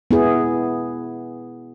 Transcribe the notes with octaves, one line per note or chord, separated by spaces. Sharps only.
B3 E4 G#4